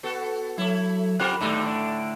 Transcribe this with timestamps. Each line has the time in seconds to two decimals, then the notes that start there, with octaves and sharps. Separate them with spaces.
0.03 B3 F#4 A4
0.58 F#3 A3 E4
1.20 C4 F4 G4 A#4 F#5 B5
1.41 D#2 A2 D3 G3 A3 D#4
1.66 D4 D7